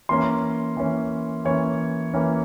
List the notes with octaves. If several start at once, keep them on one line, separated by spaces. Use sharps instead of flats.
E3 A#3 C#4 C6
E3 A#3 C#4
E3 A#3 C#4 C#5
E3 A#3 C#4